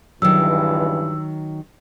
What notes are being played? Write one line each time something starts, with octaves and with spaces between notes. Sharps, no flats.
C#2 G2 D#3 E3 F#3 E6